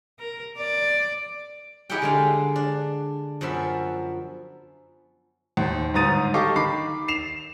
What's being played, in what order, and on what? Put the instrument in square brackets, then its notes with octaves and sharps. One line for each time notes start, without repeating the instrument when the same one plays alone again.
[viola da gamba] A#4
D5
[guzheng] D#4 E4 G4 G#4 F#5 G5
D3 G#3 F5
D4
F#2 F3 B3 E5
[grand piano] D#2 C5
G1 G#2 A#5 D#6 A6 D#7
G4 A4 D#5 F5 C#6 D6
D#3 B5 D6 C7
C7 E7 F7